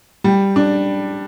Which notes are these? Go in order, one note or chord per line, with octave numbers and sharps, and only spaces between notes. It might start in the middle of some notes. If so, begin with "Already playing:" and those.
G3
D4